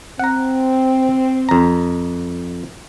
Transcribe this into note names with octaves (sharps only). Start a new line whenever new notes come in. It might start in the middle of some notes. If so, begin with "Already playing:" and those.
C4 F#5 A#5
F2 A#5